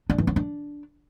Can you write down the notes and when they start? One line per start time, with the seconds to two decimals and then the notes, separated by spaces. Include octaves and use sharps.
0.10 D4
0.18 E3
0.27 C#4
0.36 D4